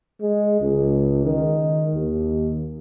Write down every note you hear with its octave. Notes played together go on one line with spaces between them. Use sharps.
G#3
C#2
D#3
D#2